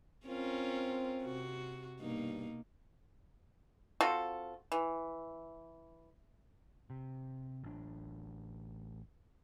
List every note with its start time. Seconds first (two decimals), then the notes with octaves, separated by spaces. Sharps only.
0.26 C4 C#4 F4 A#4
1.23 C3 F#4
2.00 G2 B2 A#3 D#4
4.01 C4 F4 F#4 A4
4.72 E3
6.90 C3
7.64 A1 D4